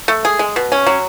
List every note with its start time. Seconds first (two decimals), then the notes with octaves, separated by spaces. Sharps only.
0.08 A3
0.25 G#4
0.39 G#3
0.56 B2
0.72 C#4
0.87 F#3